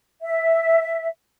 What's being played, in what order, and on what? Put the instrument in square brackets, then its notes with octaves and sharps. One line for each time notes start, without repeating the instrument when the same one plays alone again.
[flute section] E5